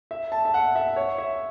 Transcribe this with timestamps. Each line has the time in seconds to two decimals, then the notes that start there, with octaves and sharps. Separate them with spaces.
0.11 E5
0.32 A5
0.45 E5
0.54 F#5
0.76 E5
0.96 C#5
1.18 E5